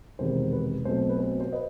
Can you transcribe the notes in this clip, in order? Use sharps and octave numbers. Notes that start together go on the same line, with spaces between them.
E1 E2 C3 D#3 C5
B4
B1 B2 A3 C4 C5
B4
C5
C5
B4 D#5